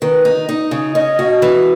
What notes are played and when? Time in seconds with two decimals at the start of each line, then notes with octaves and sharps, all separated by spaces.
0.02 D#3 B4
0.25 D#4
0.49 D#4
0.71 C#3
0.95 C#4 D#5
1.19 F#4
1.42 E3